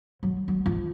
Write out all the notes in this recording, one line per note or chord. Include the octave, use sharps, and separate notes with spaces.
F#3
F#3
F3